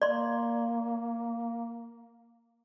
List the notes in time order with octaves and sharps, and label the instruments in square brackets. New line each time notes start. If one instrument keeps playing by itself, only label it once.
[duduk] A#3 [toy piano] D5 C6